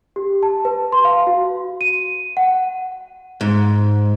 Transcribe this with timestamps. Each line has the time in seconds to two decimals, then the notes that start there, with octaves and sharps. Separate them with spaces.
0.16 G4
0.43 A5
0.65 B4
0.92 C6
1.05 F5
1.27 F#4
1.81 D#7
2.37 F#5
3.41 G#2